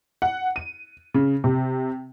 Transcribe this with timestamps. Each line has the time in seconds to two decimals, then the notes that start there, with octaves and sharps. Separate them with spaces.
0.22 F#5
0.56 D#7
1.14 C#3
1.44 C3